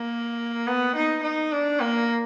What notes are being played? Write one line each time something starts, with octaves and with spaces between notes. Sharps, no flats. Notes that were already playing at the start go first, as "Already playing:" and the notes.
Already playing: A#3
B3
D#4
D#4
D4
A#3